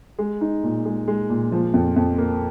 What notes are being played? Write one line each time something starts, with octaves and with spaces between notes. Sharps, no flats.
G#3
D#4
A#2
G#3
G#3
A#2
F3
F2
F2
A#3